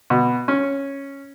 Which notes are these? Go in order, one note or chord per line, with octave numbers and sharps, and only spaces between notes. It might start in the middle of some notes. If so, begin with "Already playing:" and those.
B2
C#4